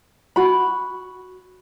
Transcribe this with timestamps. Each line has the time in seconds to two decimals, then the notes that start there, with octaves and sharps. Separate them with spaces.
0.36 F#4 B5